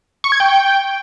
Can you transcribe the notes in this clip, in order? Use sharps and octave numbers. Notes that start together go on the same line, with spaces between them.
C#6
G#6
G5